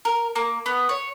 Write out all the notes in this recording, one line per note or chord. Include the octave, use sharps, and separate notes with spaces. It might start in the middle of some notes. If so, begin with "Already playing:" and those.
A#4
A#3
B3
C#5